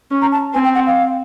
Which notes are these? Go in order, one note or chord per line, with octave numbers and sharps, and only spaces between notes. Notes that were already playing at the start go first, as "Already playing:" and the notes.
C#4
A#5
A5
C4 G#5
G5
F#5
F5